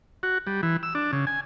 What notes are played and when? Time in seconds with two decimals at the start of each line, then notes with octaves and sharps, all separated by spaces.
0.23 F#4
0.47 G3
0.63 E3
0.83 E6
0.95 D4
1.13 C#3
1.27 G#5